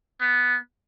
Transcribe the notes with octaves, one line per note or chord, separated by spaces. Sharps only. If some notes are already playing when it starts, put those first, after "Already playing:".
B3